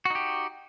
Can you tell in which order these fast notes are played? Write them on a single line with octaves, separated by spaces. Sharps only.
F#4 D#4 G4